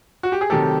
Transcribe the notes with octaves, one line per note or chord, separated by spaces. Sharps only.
F#4
G4
G#4
C3 D#3 F#3 A3 G4 A4